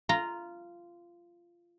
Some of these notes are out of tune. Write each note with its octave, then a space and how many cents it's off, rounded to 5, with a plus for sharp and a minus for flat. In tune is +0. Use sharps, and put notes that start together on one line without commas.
F4 -15 A#5 +0